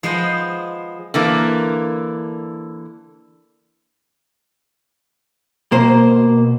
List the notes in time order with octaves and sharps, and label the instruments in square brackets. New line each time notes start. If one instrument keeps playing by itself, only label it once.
[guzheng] F3 G#3 B3 C5 D#5
[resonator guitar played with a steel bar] D3 E3 A#3
[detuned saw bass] B2 [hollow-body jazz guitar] A#3 C5